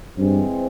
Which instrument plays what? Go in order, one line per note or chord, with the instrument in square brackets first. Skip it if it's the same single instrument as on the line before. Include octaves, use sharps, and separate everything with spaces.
[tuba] G2 [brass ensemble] E3 G#3 C4